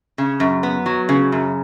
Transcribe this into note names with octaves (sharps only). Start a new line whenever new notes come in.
C#3
F#2
B3
F#3
C#3
F#2